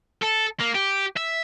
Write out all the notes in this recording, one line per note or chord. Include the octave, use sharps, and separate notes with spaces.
A4
A#3
G4
E5